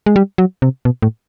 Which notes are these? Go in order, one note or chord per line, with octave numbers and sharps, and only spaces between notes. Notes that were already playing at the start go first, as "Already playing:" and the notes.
G#3
G3
F#3
C3
B2
A2